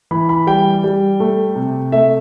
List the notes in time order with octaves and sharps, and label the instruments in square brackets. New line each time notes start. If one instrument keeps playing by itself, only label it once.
[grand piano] E3 B5
B5
G3 G5
G3
A3
C3
A3 E5